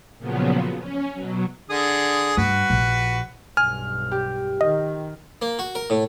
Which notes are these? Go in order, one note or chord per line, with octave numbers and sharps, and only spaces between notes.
A#2 C#3 F3 F#3 B3
C#4
B2 F#3
D3 G#4 D#6
G2 F#4 B4
A#1
B1 G2 G#5 F6
G4
D#3 D#5
A#3
F#4
A#4
A2